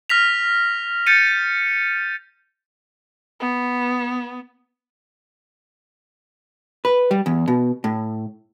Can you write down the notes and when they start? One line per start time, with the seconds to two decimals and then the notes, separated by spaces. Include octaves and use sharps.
0.10 F6 A#6 B6 F7
1.06 G6 A6 C#7 D#7
3.40 B3
6.85 B4
7.11 G3
7.26 E2
7.48 B2
7.84 A2